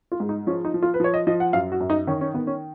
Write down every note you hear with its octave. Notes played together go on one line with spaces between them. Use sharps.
F4
G#2
D#4
F3 C#4
D#4
F3
F4
B4
F3 C#5
D#5
F3 D#5
F#5
F#2 F5
F#4
F#2
D#4
D#3 C#4
C#4
D#3 B3
C#4